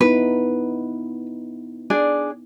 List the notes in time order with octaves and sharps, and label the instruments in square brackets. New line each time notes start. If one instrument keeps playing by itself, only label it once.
[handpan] B3 D#4 E4 [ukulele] B4
[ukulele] D4 G#4 D5